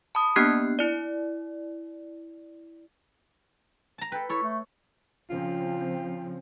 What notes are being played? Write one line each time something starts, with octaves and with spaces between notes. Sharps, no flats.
A5 B5 D#6
A#3 B3 D4 G4 F#6 C7
E4 D5
A5 A#5
A4 B4 G5
E4 A4 C#5
A3
C#3 F3 C4 F4